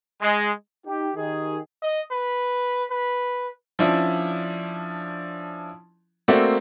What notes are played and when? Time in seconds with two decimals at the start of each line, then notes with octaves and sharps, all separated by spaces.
0.21 G#3
0.86 D#4 G4
1.16 D#3 G4 G#4
1.82 D#5
2.11 B4
2.90 B4
3.79 F3 C#4 D4 E4
6.28 A3 A#3 C4 F#4 D5 E5